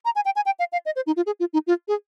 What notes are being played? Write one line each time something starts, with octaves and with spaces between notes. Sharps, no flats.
A#5
G#5
G5
G#5
G5
F5
F5
D#5
C5
D#4
F4
G#4
F4
D#4
F4
G#4